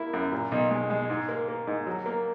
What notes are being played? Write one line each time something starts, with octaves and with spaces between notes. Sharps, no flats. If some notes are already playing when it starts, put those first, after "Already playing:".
Already playing: A#3 E4
F#2
A#2
B1
G#3
G#3
G#2
A#3
A#3
G#2
F#3
A#3